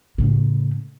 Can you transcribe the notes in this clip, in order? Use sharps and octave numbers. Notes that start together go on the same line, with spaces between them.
A2 C#3